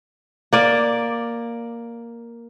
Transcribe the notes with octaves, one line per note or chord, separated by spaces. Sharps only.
A#3 D5